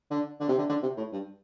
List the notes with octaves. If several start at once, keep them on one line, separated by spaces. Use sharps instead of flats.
D3
D3
C3
D3
D3
C3
A2
G2